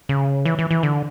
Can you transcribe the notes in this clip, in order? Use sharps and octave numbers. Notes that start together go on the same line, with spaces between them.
C#3
E3
E3
E3
D3